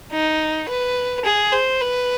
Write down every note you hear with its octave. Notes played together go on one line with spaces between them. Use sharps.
D#4
B4
G#4
C5
B4